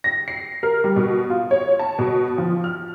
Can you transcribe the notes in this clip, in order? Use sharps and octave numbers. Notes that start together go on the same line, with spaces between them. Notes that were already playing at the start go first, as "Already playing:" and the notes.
A#6
C7
A#4
G3
B2
F4
C#5
A5
B2
F3
F6